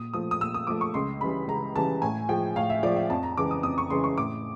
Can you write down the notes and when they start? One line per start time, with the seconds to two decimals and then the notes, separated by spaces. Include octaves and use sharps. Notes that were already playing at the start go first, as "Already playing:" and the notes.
Already playing: A#2 D#6
0.13 F3 A3 D#6
0.31 D#6
0.40 A#2 E6
0.54 D#6
0.67 F3 A3 D6
0.81 C#6
0.94 C#2 C6
1.21 C#3 E3 G3 B5
1.48 C#2 A#5
1.76 C#3 E3 G3 A5
2.02 A2 G#5
2.29 F3 G#3 G5
2.56 A2 F5
2.70 E5
2.83 F3 G#3 D5
2.96 E5
3.10 F2 A5
3.23 A#5
3.37 C#3 E3 G#3 D6
3.51 D#6
3.63 F2 D#6
3.78 C#6
3.90 C#3 E3 G#3 C6
4.04 C#6
4.18 A2 D6